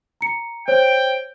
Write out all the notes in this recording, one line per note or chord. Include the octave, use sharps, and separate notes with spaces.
A#5 C#7
C5 C#5 G5